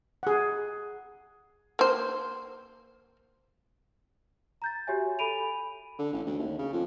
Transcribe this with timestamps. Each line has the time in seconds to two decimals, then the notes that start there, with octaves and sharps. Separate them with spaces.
0.23 G#4 F#5
1.79 A#3 C5
4.62 A#5 G6 A6
4.87 F#4 G4 C#5 E5 G#5
5.19 A4 G#5 B5 D7 D#7 F7
5.99 D3
6.13 A1
6.26 D2
6.39 D#2
6.59 C#3
6.73 F2